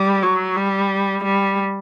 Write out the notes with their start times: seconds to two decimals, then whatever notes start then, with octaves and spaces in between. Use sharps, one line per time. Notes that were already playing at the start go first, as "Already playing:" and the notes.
Already playing: G3
0.23 F#3
0.57 G3
1.24 G3